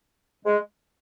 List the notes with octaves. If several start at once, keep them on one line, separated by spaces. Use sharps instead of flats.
G#3